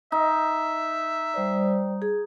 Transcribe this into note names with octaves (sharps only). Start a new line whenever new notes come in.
D#4 E5
G3 C5 D5
G#4